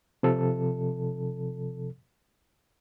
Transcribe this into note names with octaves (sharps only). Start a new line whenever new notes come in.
C3 F3 A4